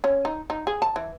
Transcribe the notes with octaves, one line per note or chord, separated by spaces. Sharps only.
C#4
D#4
D#4
G#4
A5
E3